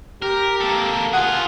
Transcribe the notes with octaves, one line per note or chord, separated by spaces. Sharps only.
G4 A#4
A#3 A4
F4 G#4 F#5